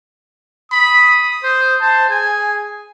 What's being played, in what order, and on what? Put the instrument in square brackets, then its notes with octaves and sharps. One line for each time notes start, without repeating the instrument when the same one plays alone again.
[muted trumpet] B5 [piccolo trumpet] D#6
[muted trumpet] C5
[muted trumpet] C5 [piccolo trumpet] A5
[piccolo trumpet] G#4 [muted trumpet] G#5